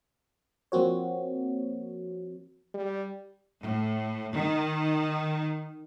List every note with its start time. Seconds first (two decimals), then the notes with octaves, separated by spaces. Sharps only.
0.72 F3 A#3 C4 F#4 C#5
2.74 G3
3.62 A2
4.35 D#3